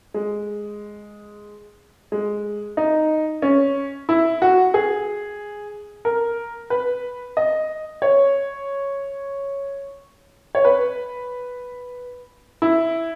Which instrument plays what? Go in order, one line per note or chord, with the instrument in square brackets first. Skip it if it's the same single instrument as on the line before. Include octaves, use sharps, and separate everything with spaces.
[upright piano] G#3
G#3
D#4
C#4
E4
F#4
G#4
A#4
B4
D#5
C#5
C#5
B4
E4